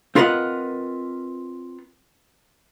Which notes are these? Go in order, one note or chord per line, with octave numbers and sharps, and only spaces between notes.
C4 F4 A#4 B4 D#5 F#5